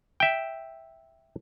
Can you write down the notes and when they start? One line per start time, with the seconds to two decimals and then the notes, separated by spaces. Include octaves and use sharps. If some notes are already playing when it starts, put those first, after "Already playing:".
0.20 E5 G5